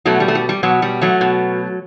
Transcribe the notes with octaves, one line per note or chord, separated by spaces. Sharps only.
B2 F#3 A3
G3
A3
G3
G3
B2 F#3
G3
F#3 A3
B2